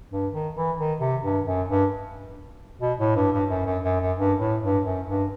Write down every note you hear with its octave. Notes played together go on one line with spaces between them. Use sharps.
G2
D#3
E3
D#3
C3
G2
F#2
G2
B2
A2
G2
G2
F#2
F#2
F#2
F#2
G2
A2
G2
F#2
G2